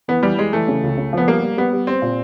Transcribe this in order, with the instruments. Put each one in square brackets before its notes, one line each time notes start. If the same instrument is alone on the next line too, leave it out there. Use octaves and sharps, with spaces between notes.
[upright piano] E3 [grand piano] B3
[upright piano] E3 [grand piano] G3
[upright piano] G3 [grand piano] G#3
[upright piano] E3 [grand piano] A3
[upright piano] C#3
C#2
C#3
[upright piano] F3 [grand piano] B3
[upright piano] G3 [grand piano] A#3
[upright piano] G3
[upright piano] G3 [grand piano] B3
[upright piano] G3
[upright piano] G3 [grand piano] C4
[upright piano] A#2